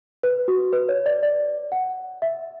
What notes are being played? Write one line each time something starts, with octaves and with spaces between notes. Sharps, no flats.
B4
F#4
B4
C#5
D5
D5
F#5
E5